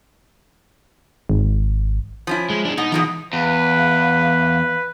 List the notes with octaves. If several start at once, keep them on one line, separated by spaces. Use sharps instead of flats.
G#1
F3 C#4 E4
G#3
G#3 D4
B2 D#4
B2 E3 F3 G#3 D#4
E2 B4 F5